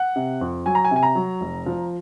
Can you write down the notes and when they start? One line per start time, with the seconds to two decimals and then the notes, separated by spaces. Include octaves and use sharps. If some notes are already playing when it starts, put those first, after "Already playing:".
Already playing: F#5
0.16 C3
0.41 F2
0.66 F#3 G#5
0.75 A#5
0.85 G#5
0.91 C3
0.96 G#5
1.03 A#5
1.15 F#3
1.41 F1
1.66 F3